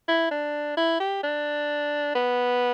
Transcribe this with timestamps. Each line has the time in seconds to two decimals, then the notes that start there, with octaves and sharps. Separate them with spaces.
0.08 E4
0.31 D4
0.77 E4
1.00 G4
1.23 D4
2.15 B3